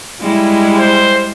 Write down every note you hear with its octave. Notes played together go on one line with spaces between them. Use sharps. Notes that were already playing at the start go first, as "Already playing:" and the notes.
G3 G#3 E4
C5